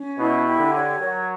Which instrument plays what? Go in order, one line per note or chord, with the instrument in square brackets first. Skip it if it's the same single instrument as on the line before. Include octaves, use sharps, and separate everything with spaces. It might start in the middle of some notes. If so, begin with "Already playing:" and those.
Already playing: [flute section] C#4
[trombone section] B2 [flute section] E4
[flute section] G4
[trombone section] D3
[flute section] C#5
[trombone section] F#3 [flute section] A#4